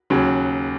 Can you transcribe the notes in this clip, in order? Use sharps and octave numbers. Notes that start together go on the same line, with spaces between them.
D#2 C#3 F#3 C#4